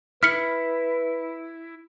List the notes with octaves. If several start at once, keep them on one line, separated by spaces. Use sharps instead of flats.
E4 B4 F6 B6 C#7